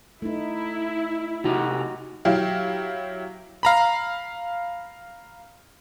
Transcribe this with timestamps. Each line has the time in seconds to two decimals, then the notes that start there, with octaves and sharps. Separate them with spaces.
0.22 A3 D#4 E4
1.44 C3 D#4 F#4 G4
2.25 F#3 E4 G4 F5
3.63 F5 A#5 B5